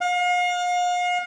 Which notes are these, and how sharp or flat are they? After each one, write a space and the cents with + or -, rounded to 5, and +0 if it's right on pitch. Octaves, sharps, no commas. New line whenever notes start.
F5 +40